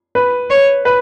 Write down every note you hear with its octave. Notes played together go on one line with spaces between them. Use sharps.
B4
C#5
B4